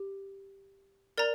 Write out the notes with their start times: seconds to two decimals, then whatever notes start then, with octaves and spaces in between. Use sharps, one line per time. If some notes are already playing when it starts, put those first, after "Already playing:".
Already playing: G4
1.18 A#4 D5 A#5